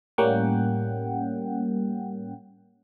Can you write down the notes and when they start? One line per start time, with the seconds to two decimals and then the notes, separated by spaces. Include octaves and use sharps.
0.18 A2 G3 A#3 C#4 F#5 G5